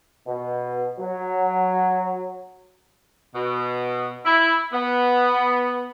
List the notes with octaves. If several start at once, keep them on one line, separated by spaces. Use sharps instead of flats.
B2
F#3
B2
E4
B3